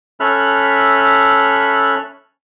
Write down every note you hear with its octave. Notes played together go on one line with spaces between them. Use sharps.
C#4 A4 E5 B5 F6 F#6